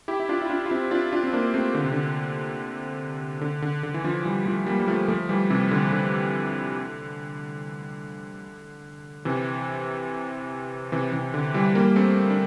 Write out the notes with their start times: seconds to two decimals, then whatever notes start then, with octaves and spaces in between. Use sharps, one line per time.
0.08 E4 G4
0.20 E4
0.29 D4 F4
0.42 E4
0.50 D4 F4
0.66 F4
0.71 C4 E4
0.91 D4 F4
1.12 D4 F4
1.24 C4
1.33 A#3 D4
1.54 A3 C4
1.74 D3
1.84 C3
1.92 D3
3.41 D3
3.62 D3
3.83 D3
3.94 E3
4.04 D3 F3
4.25 E3 G3
4.46 F3 A3
4.66 G3 A#3
4.79 G3
4.88 F3 A3
5.08 F3 A3
5.29 E3 G3
5.50 C3 E3
5.71 D3
5.92 D3
9.25 C3 E3
10.92 C3 E3
11.12 C3 E3
11.34 D3
11.54 E3 G3
11.75 G3 A#3
11.96 A3 C4
12.30 D4